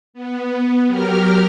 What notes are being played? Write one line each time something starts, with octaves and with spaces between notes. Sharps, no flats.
B3
F#3 G4 A#4 F6